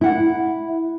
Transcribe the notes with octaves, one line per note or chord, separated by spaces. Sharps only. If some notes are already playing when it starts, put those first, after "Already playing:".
E4 F#5